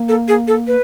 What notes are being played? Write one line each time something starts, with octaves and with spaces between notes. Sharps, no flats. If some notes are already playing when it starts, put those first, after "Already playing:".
Already playing: A#3
A4
G#4
A4
B4